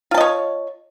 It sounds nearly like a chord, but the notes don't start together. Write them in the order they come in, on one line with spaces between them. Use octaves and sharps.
F4 A5 D#5 C#5